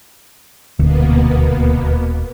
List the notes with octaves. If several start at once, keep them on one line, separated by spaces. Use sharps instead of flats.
D#1 D2 B2 A#3 B3